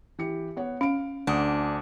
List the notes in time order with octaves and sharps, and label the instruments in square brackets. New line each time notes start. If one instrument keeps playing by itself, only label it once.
[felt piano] E3 G4 C#7
B3 C#5 F#5
[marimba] C#4 [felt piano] F5 D7
[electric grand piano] D2 [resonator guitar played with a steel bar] D4 [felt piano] F#5 D#6 C#7